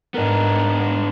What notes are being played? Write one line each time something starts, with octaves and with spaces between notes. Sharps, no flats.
G#2 B3 D4 A#4